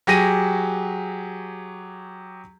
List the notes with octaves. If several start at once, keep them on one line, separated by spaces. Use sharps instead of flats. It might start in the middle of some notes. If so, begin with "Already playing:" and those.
F#3 G4 G#4 A#6 D#7